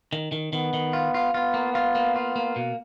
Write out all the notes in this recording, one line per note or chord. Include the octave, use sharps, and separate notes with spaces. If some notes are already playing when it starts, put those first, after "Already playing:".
D#3
D#3
D#3 B3
D#3
F4
F4
B3 F4
A#3
F4
A#3
F4
A#3
B2